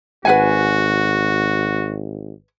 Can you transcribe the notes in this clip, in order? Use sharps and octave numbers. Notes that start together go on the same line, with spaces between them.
G#1 F#4 B4 F#5 G#5